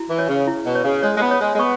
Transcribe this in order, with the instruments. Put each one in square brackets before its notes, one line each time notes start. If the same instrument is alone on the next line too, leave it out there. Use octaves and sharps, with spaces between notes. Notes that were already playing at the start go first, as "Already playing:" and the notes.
Already playing: [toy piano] E4 F#4
[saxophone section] E3
[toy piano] C#5
[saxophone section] C#3
[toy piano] E4
[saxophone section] B2
[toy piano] C#5
[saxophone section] C#3
[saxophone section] G#3 [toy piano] C#5
[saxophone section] G#3
B3
[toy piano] C#5
[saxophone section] G#3
G#3
[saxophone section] B3 [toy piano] C#6